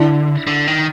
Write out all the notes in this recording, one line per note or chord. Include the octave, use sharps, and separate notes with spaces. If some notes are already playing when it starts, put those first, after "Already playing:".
Already playing: D3 D4 E4
D3
D#3